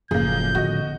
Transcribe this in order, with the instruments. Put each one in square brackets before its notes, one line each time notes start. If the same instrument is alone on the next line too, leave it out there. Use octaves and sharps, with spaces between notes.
[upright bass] F#1 [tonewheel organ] A2 C#3 F3 [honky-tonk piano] A#3 G#4 [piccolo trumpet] G6
[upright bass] D3 B3 [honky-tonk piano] F#4 D#5